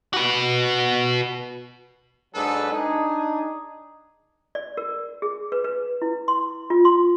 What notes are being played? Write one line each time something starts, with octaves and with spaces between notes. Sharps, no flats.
F#4 B4
G#2 F#3 D4 G#4 A4 B4
D4 D#4 G#4
D5
A#4
G#4
B4
B4
E4
C6
F4
C6